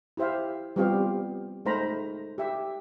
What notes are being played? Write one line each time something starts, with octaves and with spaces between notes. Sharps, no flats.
E4 G4 C5 E5 F5
G3 B3 C4 F4 G4 F5
G#3 A3 D#4 C5 A#5 B5
G4 E5